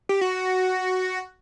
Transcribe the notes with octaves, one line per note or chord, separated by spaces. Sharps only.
G4
F#4